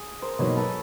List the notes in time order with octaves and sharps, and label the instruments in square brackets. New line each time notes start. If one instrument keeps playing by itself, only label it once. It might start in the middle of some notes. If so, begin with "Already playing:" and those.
Already playing: [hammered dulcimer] G#4
A#4 C5
[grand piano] B2 F#3 A#3 D#4 [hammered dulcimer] B4 C#5
[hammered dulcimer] A4 B4